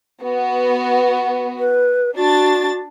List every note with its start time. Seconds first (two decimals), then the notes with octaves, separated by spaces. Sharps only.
0.23 B3 F#4
1.59 B4
2.16 D4 F#4 A6